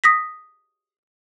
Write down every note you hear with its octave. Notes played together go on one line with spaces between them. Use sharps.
D#6 A#6 B6